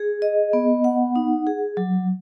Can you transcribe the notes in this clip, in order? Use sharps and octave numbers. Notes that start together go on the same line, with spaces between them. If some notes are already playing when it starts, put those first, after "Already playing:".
Already playing: G#4
D#5
B3
F#5
D#4
G#4
F#3